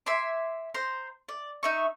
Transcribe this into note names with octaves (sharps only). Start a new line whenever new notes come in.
E5 G#5 C6 D6
C5 A#5 C6
D5
D#4 E5 C#6